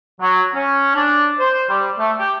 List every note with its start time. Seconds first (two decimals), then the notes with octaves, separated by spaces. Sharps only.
0.21 F#3
0.55 C#4
0.95 D4
1.39 C5
1.70 G3
1.99 A3
2.19 G4